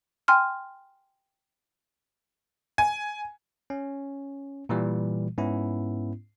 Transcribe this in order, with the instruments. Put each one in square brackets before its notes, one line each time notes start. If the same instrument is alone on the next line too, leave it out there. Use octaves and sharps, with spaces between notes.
[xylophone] G5 G#5 C6 F6
[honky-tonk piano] G#5
[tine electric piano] C#4
A#2 E3 G3
G#2 B3 C#4 E4